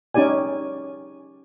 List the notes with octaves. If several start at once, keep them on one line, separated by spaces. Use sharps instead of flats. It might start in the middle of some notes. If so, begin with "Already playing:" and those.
C#4 D#4 G4 D5 G#5